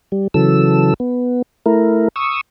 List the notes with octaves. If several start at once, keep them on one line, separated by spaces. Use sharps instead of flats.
G3
C#3 E3 F#3 A4 E6
B3
A3 E4 A#4
C#6 D#6 E6